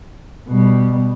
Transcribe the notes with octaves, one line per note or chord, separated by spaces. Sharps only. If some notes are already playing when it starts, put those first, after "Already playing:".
B2 G3